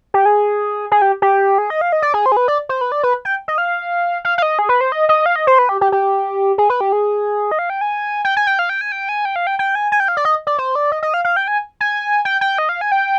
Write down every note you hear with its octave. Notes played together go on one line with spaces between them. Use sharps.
G4
G#4
G#4
G4
G4
G#4
D#5
F5
D#5
D5
G#4
C5
G#4
B4
D5
C5
B4
D5
B4
G5
D#5
F5
F5
F5
D#5
G#4
B4
C5
D#5
D#5
F5
D#5
C5
B4
G4
G4
G4
G#4
B4
G4
G#4
D#5
F5
G5
G#5
G5
G#5
G5
F5
G5
G#5
G5
G#5
G5
F5
G5
G5
G#5
G#5
G5
F5
D5
D#5
D5
C5
D5
D#5
D#5
F5
F5
G5
G#5
G#5
G5
G5
D#5
F5
G#5
G5